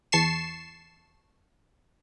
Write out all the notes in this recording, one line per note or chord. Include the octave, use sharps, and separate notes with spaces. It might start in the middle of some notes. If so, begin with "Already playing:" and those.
E2 A5 C#6 C7 E7